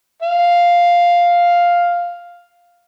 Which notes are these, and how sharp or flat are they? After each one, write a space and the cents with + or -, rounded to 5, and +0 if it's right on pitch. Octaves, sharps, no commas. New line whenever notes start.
F5 +0